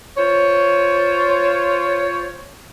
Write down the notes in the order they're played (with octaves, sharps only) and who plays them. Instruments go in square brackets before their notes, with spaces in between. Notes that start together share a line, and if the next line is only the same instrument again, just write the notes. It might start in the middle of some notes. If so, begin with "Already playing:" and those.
[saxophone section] F4 C5 C#5